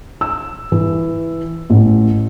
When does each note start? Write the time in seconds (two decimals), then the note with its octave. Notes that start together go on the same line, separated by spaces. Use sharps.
0.21 E6
0.72 E3
1.70 A1